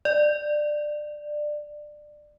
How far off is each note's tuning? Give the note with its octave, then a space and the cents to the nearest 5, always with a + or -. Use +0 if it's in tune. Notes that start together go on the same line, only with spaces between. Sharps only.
D5 +20